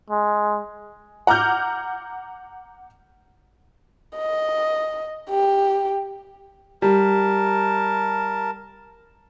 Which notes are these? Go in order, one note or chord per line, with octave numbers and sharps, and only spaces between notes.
G#3
F#5 A#5 D6 F6 G6
D#5
G4
G3 A#4 A5